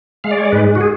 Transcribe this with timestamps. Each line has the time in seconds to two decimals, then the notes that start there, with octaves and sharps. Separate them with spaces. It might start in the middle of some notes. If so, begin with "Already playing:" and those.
0.24 G#3 F5
0.31 D5
0.38 C#5
0.46 D5
0.52 G#2 B4
0.75 F#4
0.81 G#4